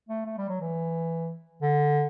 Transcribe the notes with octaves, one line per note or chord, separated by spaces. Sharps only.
A3
A3
G3
F#3
E3
D3